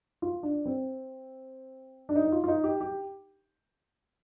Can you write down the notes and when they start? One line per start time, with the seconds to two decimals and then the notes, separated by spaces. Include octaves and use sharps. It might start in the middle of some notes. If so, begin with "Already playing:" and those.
0.22 F4
0.43 D4
0.66 C4
2.09 D4
2.15 D#4
2.26 D#4
2.32 F4
2.44 F4
2.48 D#4
2.64 G4
2.81 G4